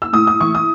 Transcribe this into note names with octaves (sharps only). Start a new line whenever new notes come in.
E6
A2 D#6
D#6
E3 C#6
D#6